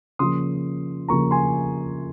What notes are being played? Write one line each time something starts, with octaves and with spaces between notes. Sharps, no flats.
C#3 F3 A#3 C6 D#6
C#3 F3 A#3 A#5 C#6
G#5 C6